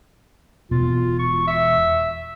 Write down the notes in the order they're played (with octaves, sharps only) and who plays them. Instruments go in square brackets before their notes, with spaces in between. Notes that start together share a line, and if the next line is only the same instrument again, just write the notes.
[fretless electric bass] E1 B2 [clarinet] F4
[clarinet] C#6
E5